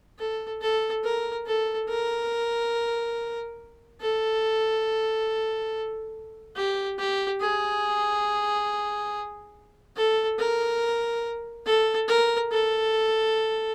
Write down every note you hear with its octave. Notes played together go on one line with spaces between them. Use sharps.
A4
A4
A#4
A4
A#4
A4
G4
G4
G#4
A4
A#4
A4
A#4
A4